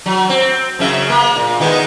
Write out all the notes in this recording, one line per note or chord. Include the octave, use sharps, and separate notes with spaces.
F#3
C4
F#2 C#3 E5
A#3
A#2
D#3 G#3 B3